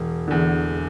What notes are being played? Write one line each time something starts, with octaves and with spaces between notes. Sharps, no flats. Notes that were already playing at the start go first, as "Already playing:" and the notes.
Already playing: E1
E2 D3